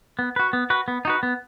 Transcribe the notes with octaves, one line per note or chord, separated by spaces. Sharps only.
B3
F#4 B4
B3
F#4 B4
B3
D#4 F#4 B4
B3